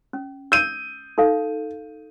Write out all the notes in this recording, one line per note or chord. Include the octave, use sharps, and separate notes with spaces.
C#4
E6 G6 D#7
D#4 A4 F5